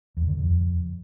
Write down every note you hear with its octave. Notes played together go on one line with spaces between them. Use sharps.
E2
A2
D3
F#2
F2